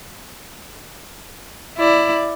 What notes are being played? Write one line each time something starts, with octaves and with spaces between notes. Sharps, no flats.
E4 D5